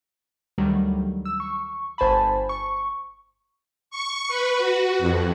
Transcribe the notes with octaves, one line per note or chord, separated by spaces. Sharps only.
D2 D#3 F#3 G3
E6
C#6
G1 C5 G#5 A5 B5
C#6
C#6
B4
F#4
F2